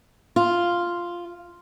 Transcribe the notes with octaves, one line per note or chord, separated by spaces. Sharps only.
F4